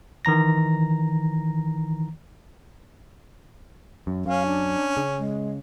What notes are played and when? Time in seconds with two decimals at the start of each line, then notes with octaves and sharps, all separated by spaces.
0.25 D#3 E3 A#5 A#6
4.07 F#2
4.26 F#2 C#4 F5
4.45 D4
4.97 C#3
5.18 G#3